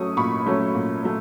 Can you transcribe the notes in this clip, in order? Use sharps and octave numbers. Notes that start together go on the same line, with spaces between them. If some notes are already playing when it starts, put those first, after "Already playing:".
Already playing: F#3 A3 C#4 C#6 D#6
A#2 B5 C#6
F#3 A3 C#4
A#2
F#3 A3